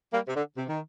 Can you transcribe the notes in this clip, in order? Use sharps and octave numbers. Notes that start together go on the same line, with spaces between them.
G3 A#3
C3
D3
C3
D#3